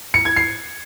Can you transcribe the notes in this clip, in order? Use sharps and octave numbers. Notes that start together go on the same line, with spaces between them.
C#7
G#6
C7